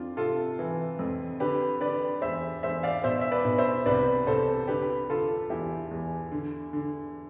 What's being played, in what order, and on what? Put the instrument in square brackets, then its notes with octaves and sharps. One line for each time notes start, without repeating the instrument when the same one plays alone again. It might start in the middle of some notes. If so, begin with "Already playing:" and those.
Already playing: [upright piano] F2 D4 F4
C3 F4 A4
E3
F2
D3 G4 B4
D3 B4 D5
E2 C5 E5
E2 C5 E5
D5 F5
B2 C5 E5
E5
B4 D5
B2
C5 E5
C2 B4 D5
C2 A4 C5
D3 G4 B4
D3 F4 A4
E2 E4 G4
E2
D3
D3